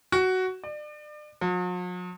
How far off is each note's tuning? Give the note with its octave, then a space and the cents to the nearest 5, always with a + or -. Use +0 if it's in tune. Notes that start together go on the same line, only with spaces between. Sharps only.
F#4 +10
D5 +35
F#3 -45